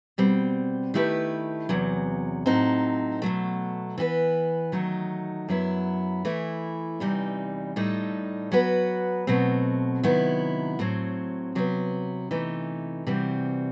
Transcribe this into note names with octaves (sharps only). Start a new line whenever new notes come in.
B2 G3 C4
D#3 A3 E4 G4 B4
E2 C3 F#3
A2 F#3 C4 D#4
B2 F#3 A3
E3 B3 F#4 B4
D#3 F#3 A3 D#4
F#2 F#3 B3 E4
E3 A3 E4
E2 C3 E3 G3 D#4
A2 G3 D#4 A4
F#3 B3 F#4 B4
B2 F#3 A3 C4 F#4
C3 D#3 F#3 B3 E4
A2 F#3 C4
C3 F#3 B3
C3 E3 A3 D#4
C3 E3 G3 C4 F#4